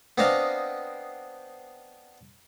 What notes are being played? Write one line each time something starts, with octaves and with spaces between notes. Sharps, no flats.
B3 C4 D4 C5 D#5 F5